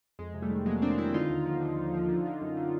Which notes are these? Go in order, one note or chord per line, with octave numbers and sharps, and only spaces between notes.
F2 G#3
C3
G3 A3
D#3
F#3 G#3 A#3
F#3 C4 D4
D#3 D4 E4
D3 D#4 F4
D#2
F3
D3
D#2
F3
D3
D3
F#2
D3